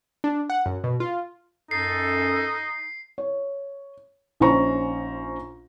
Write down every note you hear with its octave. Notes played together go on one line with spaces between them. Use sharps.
D4
F#5
F#2
B2
F4
F#2 D#4 A4 C7
C#5
A#1 C#4 D#4 C5 A#5 C#6